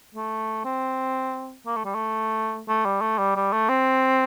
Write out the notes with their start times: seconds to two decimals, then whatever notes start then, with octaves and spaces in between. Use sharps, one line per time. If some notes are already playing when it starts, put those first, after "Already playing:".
0.15 A3
0.65 C4
1.66 A#3
1.76 A3
1.85 G3
1.95 A3
2.68 A3
2.85 G3
3.01 A3
3.19 G3
3.36 G3
3.53 A3
3.69 C4